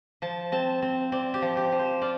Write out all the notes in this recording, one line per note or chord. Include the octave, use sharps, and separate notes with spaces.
F3 A5
C4 A5
C4
C4 D5
G4
F3
G4
F3
C5
F4 D5